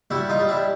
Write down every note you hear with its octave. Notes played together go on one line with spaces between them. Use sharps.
G3 E4 F#4
D#4 F4
G3
D4 E4